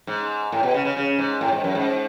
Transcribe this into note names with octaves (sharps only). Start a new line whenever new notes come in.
G#2
A2
B2
C#3
C#3
C#3
G#2
A2
G#2
F#2
G#2